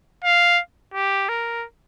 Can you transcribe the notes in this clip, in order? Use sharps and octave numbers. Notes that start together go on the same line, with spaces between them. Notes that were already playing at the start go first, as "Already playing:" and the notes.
F5
G4
A#4